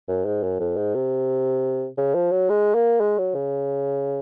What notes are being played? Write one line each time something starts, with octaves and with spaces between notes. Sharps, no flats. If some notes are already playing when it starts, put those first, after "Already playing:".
F#2
G#2
F#2
F2
G#2
C3
C#3
F3
F#3
G#3
A#3
G#3
F#3
C#3